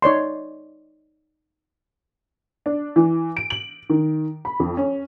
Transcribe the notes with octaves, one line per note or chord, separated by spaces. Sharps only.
D#4 C#5 D5 C6
D4
E3
D7
F#7
D#3
B5
F2
C#4